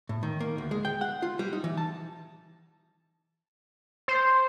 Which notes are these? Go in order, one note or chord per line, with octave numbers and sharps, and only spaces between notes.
A2
D#3
A#3
D2
G#3
G5
F#5
F4
G3
D#4
E3
A5
C5